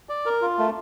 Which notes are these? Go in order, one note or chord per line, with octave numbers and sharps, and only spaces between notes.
D5
A#4
F4
A3